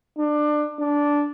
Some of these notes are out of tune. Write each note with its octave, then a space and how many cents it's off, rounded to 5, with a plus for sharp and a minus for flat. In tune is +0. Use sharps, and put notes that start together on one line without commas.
D4 +20
D4 -10